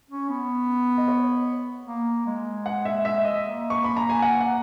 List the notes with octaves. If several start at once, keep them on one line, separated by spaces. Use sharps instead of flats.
C#4
B3
D#5
C#5
A#3
G#3
F#5
E5
E5
D#5
A#3
C#6
B5
A#5
G#5
F#5
F#5